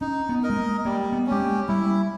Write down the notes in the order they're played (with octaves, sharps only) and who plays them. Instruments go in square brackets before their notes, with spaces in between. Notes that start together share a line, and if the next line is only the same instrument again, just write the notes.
[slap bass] C#4 [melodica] D#4
[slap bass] B3
[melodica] A#4 D#5
[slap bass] G#3
A#3
[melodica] G3 [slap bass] A#3
[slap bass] B3
[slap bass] G#3 [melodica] C#4 G4
[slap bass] A#3
[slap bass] G3 [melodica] E4